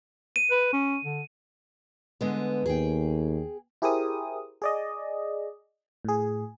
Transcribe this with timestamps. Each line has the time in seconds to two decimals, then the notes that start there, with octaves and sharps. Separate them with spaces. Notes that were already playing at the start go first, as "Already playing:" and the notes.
0.36 D#7
0.51 B4
0.73 C#4
1.05 D3
2.21 D3 G#3 B3
2.66 D#2 G#4 G5
3.82 E4 G4 G#4 A#4 C5 D#6
4.62 G#4 D5 D#5
6.05 A2 G#4